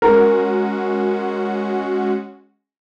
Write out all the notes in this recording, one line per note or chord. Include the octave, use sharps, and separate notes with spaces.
G#3 C#4 F#4 A#4